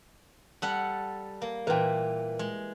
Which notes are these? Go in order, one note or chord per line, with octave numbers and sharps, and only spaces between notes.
G3 A4 F#5
A#3
A#2 E3 A#4 G5
G#3